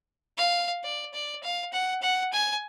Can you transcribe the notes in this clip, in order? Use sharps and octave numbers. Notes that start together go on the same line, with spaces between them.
F5
D5
D5
F5
F#5
F#5
G#5